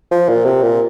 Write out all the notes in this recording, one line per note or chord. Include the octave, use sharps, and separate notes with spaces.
F3
A#2
C3
A#2